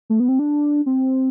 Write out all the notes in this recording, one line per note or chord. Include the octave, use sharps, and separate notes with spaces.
A3
B3
C4
D4
C4